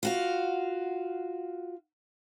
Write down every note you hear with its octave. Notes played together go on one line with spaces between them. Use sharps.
F4 F#4 F5